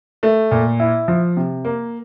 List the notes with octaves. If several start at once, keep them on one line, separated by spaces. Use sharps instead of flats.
A3
A#2
E4
F3
C3
A#3